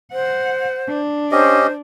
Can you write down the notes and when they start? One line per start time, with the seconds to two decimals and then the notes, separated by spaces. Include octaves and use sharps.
0.12 C5 F#5
0.88 D4
1.32 C#4 G4 C5 D#5